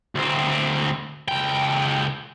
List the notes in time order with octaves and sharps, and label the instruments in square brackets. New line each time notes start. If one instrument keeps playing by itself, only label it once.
[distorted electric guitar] D2 C4
C#2 G5